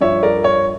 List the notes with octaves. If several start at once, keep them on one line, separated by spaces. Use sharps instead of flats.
G2 F3 C#5 E5
A#4 D5
C#5